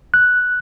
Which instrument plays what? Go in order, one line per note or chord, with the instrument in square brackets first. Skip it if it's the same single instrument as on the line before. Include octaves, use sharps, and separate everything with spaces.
[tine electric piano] F#6